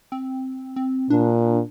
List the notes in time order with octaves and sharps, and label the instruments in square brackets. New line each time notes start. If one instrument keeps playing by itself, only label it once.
[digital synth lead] C4
C4
[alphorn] A#2 [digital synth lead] D4